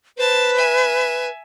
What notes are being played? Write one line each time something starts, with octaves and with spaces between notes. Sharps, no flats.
B4 C5 A5
E5 G#5